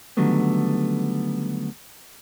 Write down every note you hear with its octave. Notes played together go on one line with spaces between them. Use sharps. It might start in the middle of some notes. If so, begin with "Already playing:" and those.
D3 D#3 F#3 G3 A3 B3